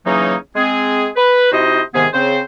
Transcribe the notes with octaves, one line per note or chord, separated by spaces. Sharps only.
C#3 E3 F#3 A#3 C#4 D#4
G#3 C4 G#4
B4
C3 D#4 E4 F#4 C5 D#5
G#2 C3 D#3 B3 G#4
C#3 C4 C5